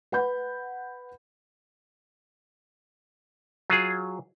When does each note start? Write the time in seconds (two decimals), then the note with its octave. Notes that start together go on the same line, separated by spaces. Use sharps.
0.12 B4 F#5 B5 G6
3.70 F#3 F4 G#4